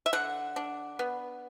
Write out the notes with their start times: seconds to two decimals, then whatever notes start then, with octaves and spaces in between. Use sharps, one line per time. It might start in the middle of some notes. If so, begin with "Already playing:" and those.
0.06 E5
0.13 D3 F#5
0.56 D4
0.99 B3